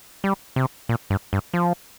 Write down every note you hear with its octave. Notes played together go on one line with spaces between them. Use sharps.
G3
C3
A#2
G2
G2
F3